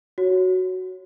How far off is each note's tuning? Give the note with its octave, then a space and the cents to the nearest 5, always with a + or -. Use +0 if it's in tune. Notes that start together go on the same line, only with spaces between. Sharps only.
F#4 +0 C#5 +0